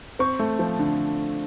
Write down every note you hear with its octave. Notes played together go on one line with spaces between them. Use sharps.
C4 C#6
A3
F3
D3